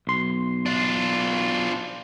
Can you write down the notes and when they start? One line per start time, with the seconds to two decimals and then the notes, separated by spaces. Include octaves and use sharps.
0.07 B1 C6
0.66 D4 F4